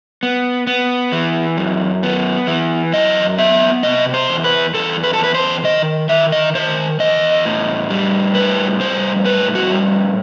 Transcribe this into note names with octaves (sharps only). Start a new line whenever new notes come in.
B3
B3
E3
F#2
B3
E3
F#2 D#5
B3 E5
C3 D#5
C5
E2
B4
E2 A4
B4
A4
E2
B4
C5
D#3 D#5
D#3 E5
D#5
D#3 C5
E2 D#5
A2
G3
A2 B4
G3 C5
A2 B4
F#4
G3